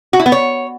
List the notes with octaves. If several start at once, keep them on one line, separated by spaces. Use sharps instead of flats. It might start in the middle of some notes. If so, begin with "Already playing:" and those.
F#4
E4
B3
C#5